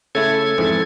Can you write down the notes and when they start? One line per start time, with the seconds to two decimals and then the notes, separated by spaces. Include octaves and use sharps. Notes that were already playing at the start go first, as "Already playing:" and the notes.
0.15 C#3 A3 E4 A4 G#6
0.58 F2 G#2 E3